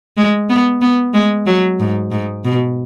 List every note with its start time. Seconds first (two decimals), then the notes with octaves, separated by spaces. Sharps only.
0.17 G#3
0.50 B3
0.81 B3
1.14 G#3
1.47 F#3
1.80 G#2
2.12 G#2
2.45 B2